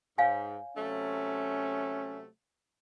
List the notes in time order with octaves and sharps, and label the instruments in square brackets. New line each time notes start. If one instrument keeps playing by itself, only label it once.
[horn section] G#2 [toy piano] C#5 F5 G#5
[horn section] C3 F#3 A3 [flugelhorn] C#4